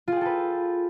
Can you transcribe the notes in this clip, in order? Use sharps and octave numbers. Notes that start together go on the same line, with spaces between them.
F4 G#4 A4 B4 G5